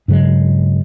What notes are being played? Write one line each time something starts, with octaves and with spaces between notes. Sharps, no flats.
G2 C#3 F#3 G#3